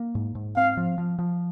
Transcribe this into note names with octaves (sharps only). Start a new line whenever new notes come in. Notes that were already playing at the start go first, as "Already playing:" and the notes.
Already playing: A#3
G#2
G#2
C4 F5
F3
F3
F3